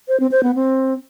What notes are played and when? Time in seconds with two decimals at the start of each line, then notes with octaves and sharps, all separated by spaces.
0.08 C5
0.20 C4
0.31 C5
0.43 B3
0.55 C4